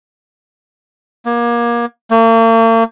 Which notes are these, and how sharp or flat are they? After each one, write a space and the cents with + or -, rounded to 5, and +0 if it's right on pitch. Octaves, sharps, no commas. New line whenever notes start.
A#3 +25
A#3 -45